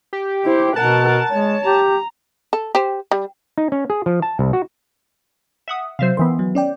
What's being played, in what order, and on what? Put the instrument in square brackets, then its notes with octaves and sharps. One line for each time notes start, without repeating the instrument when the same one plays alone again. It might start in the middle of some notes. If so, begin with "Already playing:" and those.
[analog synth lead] G4
[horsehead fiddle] E4 C5
[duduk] B2 [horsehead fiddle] A#4 F#5 [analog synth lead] A5
[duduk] G#3 [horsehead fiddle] C#5
[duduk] G4 [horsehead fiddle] A#5
[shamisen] A4
G4 C5
G3
[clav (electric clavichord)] D#4
C#4
G#4
F3
A5
C2
F#4
[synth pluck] E5 F#5 D#6
[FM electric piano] C3 F#3 [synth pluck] C5 E5 F5
[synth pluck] D#3 E3 B3 [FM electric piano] C6
[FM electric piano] F#3
C#4 D5 G5